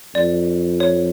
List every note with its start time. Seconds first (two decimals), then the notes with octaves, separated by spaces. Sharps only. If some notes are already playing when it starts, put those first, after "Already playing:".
0.15 F2 D5
0.80 C#5